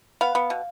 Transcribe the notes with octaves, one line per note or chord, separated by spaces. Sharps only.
B3 F5
B3
B2